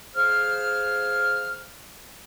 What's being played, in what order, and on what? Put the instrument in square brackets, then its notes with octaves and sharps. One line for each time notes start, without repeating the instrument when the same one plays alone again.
[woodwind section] G#4 C5 F5 F6